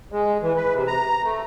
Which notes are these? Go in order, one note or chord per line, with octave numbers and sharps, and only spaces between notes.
G#3
E3
B4
C3
A#5
A3